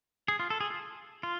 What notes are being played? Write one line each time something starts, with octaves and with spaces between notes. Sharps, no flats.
G#4
F4
A4
G#4
F4
F4